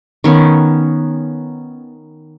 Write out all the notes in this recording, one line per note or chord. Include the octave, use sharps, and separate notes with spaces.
D#3 B3 C#4